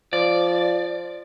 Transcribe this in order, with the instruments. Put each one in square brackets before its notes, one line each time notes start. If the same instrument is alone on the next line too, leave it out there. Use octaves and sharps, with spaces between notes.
[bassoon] F3 [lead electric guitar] D5